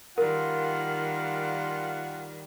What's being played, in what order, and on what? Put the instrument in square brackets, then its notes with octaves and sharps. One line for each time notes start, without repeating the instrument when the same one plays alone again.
[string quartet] D#3 G3 [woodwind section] F4 [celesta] A#4 [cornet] F#5